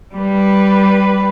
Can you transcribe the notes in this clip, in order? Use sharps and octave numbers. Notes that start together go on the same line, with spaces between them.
G3 B4